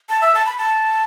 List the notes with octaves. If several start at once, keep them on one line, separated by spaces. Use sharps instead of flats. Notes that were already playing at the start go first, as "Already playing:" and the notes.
A5
E5
A5
B5
A5